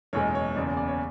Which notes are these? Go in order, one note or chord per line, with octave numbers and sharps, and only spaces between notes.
F#1 E2 B2 G#3 C#5
C#5
F#1 E2 C#3 D5
D5
D5
C#5